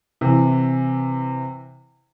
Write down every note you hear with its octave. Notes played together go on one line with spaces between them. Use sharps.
C3 E3